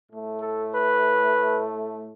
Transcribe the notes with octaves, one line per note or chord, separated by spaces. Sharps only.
A2 A3
A4
B4